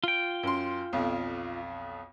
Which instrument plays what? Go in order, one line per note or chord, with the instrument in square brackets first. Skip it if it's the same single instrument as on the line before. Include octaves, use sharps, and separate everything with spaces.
[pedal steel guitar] F4 G5
[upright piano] F#2 C6
B1 F2